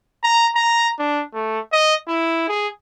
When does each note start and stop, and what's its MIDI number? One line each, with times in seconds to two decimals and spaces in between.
0.24 0.47 82
0.56 0.89 82
0.99 1.23 62
1.34 1.59 57
1.72 1.95 75
2.08 2.45 64
2.48 2.68 68